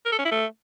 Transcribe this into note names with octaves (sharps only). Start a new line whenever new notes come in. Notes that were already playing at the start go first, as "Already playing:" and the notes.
A#4
A4
C#4
E4
A3